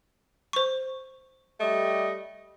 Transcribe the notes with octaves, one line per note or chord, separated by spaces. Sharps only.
C5 C#6
G3 A3 D#5